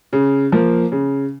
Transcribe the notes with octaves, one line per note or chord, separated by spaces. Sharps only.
C#3
F3 A#3
C#3